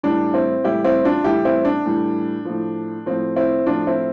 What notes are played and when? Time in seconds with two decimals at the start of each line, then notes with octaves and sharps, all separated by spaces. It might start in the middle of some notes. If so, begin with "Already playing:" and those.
0.03 A2 E3 G3 D4
0.34 C4 E4
0.64 A2 E3 G3 E4 G4
0.84 C4 E4
1.05 D4 F4
1.24 A2 E3 G3 E4 G4
1.45 C4 E4
1.65 D4
1.85 A2 E3 G3
2.45 A2 F3
3.06 A2 F3 C4
3.36 C4 E4
3.66 A2 F3 D4 F4
3.87 C4 E4